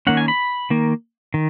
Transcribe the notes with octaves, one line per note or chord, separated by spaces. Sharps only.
D#3 A#3 C#4 F#5
G#5
B5
D#3 A#3
D#3